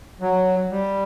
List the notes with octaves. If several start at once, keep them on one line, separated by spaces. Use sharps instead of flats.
F#3
G3